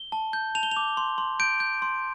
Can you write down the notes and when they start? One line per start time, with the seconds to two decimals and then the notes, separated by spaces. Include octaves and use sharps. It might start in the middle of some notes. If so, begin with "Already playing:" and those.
Already playing: G7
0.12 A5
0.33 G6
0.55 A5 F7
0.63 G7
0.71 F7
0.77 D6
0.97 C6
1.18 C6
1.40 G6 D7
1.60 G6
1.82 C6